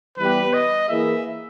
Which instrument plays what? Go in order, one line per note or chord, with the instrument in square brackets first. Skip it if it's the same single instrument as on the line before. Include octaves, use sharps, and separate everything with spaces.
[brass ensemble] E3 G3 B3 G4 [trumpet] B4
[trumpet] D#5
[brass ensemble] E3 A#3 E4 G#4 [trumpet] E5